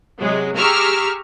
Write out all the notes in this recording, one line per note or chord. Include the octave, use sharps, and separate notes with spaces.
C3 F#3 G#3
G4 G#4 A#5 C#6 E6 F6